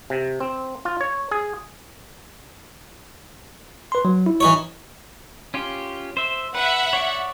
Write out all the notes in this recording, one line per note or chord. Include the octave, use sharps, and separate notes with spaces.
C3
C4
F4
C#5
G#4
B4 C6
F#3
E4
E3 D#4 C#5
C#4 F4 G4
C5 E5
B4 E5 F#5
C#5 D5